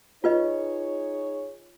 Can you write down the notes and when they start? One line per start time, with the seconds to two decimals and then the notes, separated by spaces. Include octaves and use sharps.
0.24 D#4 F4 G#4 B4 C#5 D#5